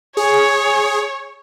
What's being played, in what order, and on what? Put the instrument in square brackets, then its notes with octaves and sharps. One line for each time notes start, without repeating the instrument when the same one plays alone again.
[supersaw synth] G#4 [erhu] C#5